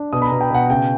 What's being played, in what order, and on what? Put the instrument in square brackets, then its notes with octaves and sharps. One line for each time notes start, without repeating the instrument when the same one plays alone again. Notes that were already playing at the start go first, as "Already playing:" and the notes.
Already playing: [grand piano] D4
B2 D#6
B5
B2 A#5
G5
B2 F#5
C#3 G5